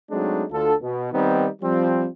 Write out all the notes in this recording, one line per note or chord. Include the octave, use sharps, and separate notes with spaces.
F#3 G#3 A3 C4 D4 D#4
D2 D3 F4 A4
B2
D#3 G3 B3 C4 D#4
F3 G3 C4